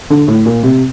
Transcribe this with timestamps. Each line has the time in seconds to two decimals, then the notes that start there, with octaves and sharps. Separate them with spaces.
0.10 D3
0.27 A2
0.46 A#2
0.63 C3